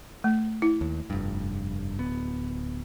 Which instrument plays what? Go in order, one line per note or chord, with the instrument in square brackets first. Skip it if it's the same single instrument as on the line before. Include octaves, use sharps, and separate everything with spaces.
[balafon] A3
E4
[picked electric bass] D#2
F1 G2
D1 B3